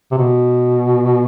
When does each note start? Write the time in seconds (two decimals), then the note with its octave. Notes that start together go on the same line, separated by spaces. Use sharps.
0.12 C3
0.18 B2